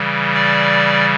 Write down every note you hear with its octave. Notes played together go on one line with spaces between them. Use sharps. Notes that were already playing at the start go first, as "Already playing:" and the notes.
Already playing: C#3 E3 G3
D5